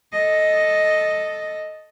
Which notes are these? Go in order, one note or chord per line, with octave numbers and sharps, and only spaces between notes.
A4 D#5